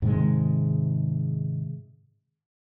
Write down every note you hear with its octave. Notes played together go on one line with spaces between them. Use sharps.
G#2 C3 D#3 G#3